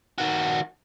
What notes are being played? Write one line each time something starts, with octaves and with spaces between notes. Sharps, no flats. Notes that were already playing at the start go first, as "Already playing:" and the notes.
D#3 F#4